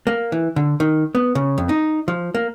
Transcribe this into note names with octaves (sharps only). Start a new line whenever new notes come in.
A#3
E3
D3
D#3
B3
C#3
F2
D#4
F3
A#3